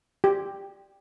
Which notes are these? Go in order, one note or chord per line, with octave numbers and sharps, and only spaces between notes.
G4